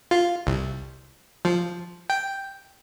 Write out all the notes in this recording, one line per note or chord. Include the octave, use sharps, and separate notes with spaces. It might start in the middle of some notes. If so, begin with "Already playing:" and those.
F4
C2
F3
G5